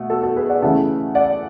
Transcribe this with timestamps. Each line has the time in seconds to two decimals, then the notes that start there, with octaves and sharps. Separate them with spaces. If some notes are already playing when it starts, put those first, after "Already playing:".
Already playing: B2 A3 F#5
0.10 F#4 A4
0.23 F#4 A4
0.36 G#4 B4
0.49 D5 F#5
0.62 C#3 E3 A3 F#5 A5
1.15 D5 F#5